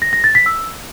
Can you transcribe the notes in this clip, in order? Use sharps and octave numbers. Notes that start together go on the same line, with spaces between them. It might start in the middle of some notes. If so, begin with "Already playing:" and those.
A#6
A#6
A6
B6
E6